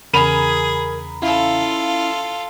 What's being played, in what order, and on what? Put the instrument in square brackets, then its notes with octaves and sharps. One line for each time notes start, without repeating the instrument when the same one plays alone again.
[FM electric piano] E2 C#3 A#5 [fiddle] G#4 [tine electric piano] A#4 [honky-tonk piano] B5 D#7 F7
[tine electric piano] C#4 E4 F5 [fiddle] F4 A4